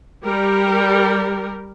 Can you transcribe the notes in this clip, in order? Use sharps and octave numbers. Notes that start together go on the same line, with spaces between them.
G3 G4 A#4